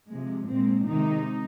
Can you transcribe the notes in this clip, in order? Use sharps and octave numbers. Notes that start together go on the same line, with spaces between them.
C3 F3 G#3
A#2 G#3 C4
C3 D#3 G#3 D#4